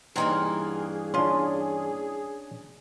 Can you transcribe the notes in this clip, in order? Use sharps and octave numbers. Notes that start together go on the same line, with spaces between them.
G2 E3 F#3 A#3 C4 D#4 G#4
C#4 D4 F4 C6